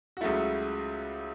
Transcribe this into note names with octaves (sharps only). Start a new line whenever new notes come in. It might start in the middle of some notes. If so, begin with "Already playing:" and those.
F#4
C#2 C#3 F#3 A3 E4